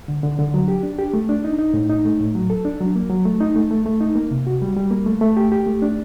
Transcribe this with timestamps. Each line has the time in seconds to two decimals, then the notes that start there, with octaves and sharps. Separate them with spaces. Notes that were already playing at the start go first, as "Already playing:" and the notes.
0.08 D3
0.23 D3
0.39 D3
0.54 F#3
0.68 G4
0.83 D4
0.99 G4
1.14 A3
1.29 D4
1.44 D#4
1.59 D#4
1.74 A2
1.89 D#4
2.05 A3
2.20 A2
2.35 F#3
2.50 A4
2.65 D4
2.80 F#3
2.96 A#3
3.10 F#3
3.25 A3
3.41 D#4
3.56 A3
3.71 A3
3.86 A3
4.00 D#4
4.15 A#3
4.31 C3
4.47 F#4
4.62 G3
4.77 G3
4.91 A#3
5.06 A3
5.21 A3
5.37 G4
5.52 G4
5.67 A3
5.82 D4